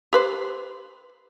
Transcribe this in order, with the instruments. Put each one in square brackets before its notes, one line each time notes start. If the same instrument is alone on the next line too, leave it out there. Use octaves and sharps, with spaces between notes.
[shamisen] G4 B4 C5